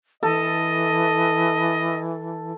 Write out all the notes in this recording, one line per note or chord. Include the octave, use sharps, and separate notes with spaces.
E3 A4 D#5